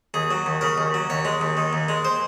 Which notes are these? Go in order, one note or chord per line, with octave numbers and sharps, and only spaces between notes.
D#2 G#4
F#3
D#2
C#3 A#4
D#2
F#3
D#2 C#5
G#3
D#2
D#3
D#2
G#3
C5